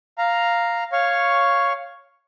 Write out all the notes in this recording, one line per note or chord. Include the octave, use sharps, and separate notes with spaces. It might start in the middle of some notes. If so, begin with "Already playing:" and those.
F5 A#5
C#5 F5 C#6